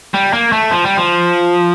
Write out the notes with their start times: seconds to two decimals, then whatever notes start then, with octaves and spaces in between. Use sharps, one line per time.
0.14 G3
0.33 A#3
0.52 A3
0.71 F3
0.84 G3
0.97 F3